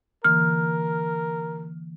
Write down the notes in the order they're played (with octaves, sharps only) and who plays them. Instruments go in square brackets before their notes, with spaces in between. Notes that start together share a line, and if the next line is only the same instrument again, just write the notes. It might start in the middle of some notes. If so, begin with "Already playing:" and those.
[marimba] D3 E3 A#3 [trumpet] A#4 [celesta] F6